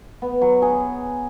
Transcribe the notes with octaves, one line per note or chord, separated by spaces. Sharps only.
B3
F#3
G#4